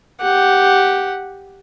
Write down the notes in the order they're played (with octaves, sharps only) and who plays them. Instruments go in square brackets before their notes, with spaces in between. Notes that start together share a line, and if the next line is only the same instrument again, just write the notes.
[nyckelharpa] G4 F#5